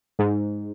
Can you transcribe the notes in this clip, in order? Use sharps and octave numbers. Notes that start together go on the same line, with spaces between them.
G#2